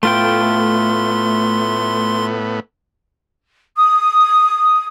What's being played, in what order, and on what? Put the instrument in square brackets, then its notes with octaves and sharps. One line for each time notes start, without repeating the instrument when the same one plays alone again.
[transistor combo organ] A2 B3 [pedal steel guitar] A3 F4 G5 [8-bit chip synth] C6
[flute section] D#6